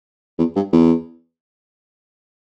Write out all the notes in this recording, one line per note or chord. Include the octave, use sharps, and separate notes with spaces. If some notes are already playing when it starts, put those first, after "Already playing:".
E2
G2
E2